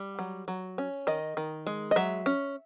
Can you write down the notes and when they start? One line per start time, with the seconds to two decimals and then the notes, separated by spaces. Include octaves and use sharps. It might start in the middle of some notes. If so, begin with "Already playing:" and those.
Already playing: G3
0.19 F#3
0.48 F#3
0.78 C#4
1.07 D#3 D#5
1.37 D#3
1.67 G#3
1.91 D#5
1.96 F#3 E5
2.26 C#4